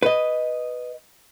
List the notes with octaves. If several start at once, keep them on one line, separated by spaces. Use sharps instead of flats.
B4 D#5